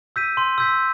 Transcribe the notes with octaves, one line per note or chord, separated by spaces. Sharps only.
E6 G6 B6 D#7
C6
E6 G6 B6